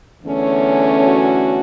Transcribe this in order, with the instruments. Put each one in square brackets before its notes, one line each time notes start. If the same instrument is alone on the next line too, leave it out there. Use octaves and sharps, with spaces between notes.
[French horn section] E2 D3 A3 C#4
F#4